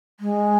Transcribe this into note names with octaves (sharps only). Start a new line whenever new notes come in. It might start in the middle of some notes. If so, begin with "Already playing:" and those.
G#3